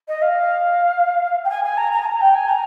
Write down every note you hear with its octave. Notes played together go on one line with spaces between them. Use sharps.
D#5
F5
G5
G#5
G#5
A#5
A#5
G#5
A#5
G5
G#5
A#5